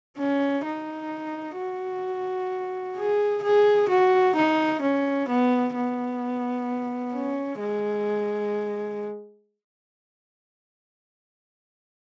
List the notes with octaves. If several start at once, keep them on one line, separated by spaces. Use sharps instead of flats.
C#4
D#4
F#4
G#4
G#4
F#4
D#4
C#4
B3
B3
C#4
G#3